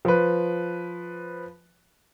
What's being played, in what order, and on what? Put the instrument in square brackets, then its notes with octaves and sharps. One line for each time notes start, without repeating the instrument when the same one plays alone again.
[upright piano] F3 B4